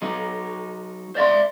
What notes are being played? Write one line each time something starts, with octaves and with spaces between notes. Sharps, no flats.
F#3 D#4
C5 D5 E5 C6